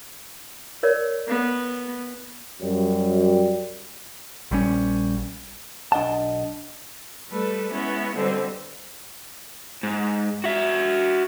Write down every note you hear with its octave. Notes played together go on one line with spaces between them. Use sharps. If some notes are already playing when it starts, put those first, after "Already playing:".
A#4 C#5 D5
B3
F#2 G3
A#1 G3 C#4
B1 D4 D#5 F#5 A5
G3 A3 A4 B4
G#3 B3 C#4 E4
B2 D3 G3 C4
G#2
F#4 E5